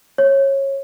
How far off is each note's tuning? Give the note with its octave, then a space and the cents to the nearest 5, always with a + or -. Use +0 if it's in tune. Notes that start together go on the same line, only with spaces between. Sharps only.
C#5 -20